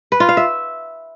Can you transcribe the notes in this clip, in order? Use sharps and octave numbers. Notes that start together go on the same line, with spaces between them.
B4
F4
F5
E5